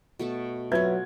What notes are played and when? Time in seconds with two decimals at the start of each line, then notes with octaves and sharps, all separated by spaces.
0.19 B2 A3 A5
0.72 F#3 F4 F#4 B4 E5 G#6